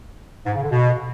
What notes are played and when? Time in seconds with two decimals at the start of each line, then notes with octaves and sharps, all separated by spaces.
0.46 G#2
0.55 C#3
0.63 D3
0.71 B2